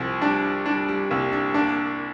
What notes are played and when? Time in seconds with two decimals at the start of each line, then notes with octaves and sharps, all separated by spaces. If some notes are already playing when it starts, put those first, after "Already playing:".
Already playing: C2 F3
0.21 G3 D4
0.66 G3 D4
0.88 G3
1.10 C2 A#3
1.32 D4
1.54 A#3 D4